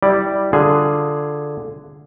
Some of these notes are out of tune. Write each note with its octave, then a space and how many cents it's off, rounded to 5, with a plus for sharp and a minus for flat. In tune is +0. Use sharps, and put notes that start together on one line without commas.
G3 -5 E4 -10 D5 +5
D3 +0 F4 +0 G#4 +0